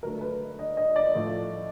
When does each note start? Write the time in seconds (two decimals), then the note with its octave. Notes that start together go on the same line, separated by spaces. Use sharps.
0.03 D3 F#3 A3 A#4
0.21 B4
0.59 D#5
0.77 D#5
0.96 D5
1.15 A2 F3 A3